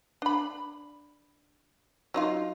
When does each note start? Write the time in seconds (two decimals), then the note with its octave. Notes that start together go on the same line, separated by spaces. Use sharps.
0.22 D4 B5
2.14 F#3 D#4 F4